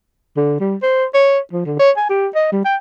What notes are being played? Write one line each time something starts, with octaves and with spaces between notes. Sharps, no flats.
D3
G3
C5
C#5
F3
D3
C#5
G#5
G4
D#5
G3
G5